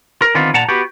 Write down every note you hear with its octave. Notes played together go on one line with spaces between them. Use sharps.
A#4
D3 D#3 B3 C4 F4
A#2 F#5 A5 A#5
B3 F#4 G4